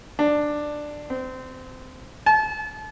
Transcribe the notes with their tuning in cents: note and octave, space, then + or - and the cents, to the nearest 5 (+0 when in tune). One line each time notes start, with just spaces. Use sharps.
D4 +10
C4 -25
A5 -35